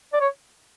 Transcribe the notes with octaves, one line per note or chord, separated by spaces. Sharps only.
D5
C#5